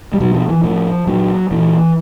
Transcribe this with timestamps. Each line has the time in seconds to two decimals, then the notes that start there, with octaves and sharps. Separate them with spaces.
0.14 G3
0.20 B2 F#3
0.34 F3
0.49 E3
0.64 A2 F3
1.07 A#2 F#3
1.51 A#2 E3